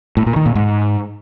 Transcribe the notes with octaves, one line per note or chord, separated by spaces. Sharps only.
A2
A#2
D#3
A#2
G#2